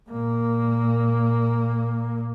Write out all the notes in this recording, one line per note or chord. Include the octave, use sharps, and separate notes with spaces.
A#2 A#3